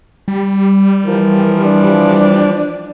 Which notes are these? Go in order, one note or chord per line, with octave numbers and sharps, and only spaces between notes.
G3
E3 F3 A#4
D4